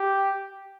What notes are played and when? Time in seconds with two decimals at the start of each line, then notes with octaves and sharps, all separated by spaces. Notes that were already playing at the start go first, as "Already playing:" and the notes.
Already playing: G4